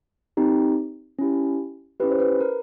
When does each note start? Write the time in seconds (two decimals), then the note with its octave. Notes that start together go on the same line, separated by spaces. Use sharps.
0.37 C4 D#4 G4
1.19 C#4 E4 G4
2.00 C#4 E4 G4 B4
2.11 C5
2.20 B4
2.40 A#4